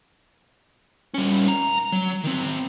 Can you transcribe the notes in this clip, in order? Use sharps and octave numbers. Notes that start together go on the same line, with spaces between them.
G3 C#4
A#5
F#3
D#3 C4